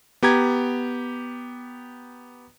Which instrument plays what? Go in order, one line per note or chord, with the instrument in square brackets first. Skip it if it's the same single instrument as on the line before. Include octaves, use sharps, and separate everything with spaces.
[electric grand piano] B3 G4 A#5 G#6